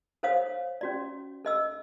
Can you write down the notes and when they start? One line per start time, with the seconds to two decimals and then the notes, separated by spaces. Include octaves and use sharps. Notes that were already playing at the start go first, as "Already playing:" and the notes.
0.23 A4 C5 C#5 F5 D#6
0.81 C#4 F#4 D5
1.45 A4 D#5 E6